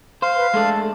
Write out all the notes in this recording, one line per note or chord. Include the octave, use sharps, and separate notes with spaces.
C5 F5
B4
G#3 A3 D4 A4